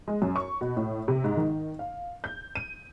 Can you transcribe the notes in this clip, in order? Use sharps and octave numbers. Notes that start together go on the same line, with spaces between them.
G#3
F#2
C#6
B2
A2
C3
G#2
D#3
F5
G6
D#7